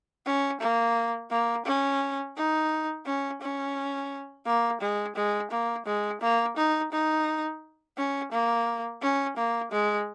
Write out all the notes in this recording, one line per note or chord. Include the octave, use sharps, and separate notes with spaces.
C#4
A#3
A#3
C#4
D#4
C#4
C#4
A#3
G#3
G#3
A#3
G#3
A#3
D#4
D#4
C#4
A#3
C#4
A#3
G#3